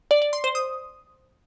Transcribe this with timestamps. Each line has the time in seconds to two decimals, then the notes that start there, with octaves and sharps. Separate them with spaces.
0.11 D5
0.22 D5
0.33 C6
0.44 C5
0.55 D#6